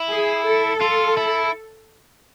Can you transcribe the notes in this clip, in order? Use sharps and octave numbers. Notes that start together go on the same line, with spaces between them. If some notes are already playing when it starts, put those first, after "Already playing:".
Already playing: E4
G#4
A4
F4
E4